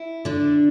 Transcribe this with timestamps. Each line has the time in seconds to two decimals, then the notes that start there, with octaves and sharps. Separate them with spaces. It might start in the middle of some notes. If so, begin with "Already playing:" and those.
Already playing: E4
0.25 D3 D4